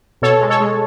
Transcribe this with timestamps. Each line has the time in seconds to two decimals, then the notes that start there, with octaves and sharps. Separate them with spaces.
0.22 B2 A4 C#5
0.41 G#3
0.50 A4 C#5
0.60 G#3